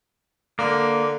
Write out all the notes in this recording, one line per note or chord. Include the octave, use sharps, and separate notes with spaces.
D3 A#3